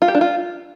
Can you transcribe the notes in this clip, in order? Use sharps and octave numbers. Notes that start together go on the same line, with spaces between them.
F4
G4
D4
F4